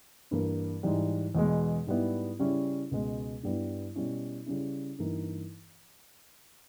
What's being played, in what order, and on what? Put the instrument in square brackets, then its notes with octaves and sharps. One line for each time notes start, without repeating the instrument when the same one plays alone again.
[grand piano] G2 E3 A#3
G#2 E3 G3
E2 B2 G#3
G#2 G3 B3 E4
C#3 G3 C#4 E4
C#2 B2 G#3
G2 G3 B3 E4
B2 G3 C#4 E4
C#3 G3 C#4 E4
G2 E3 A#3 D#4